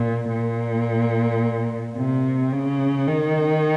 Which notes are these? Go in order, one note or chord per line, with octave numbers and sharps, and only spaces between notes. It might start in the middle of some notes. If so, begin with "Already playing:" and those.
Already playing: A#2
A#2
C3
C#3
D#3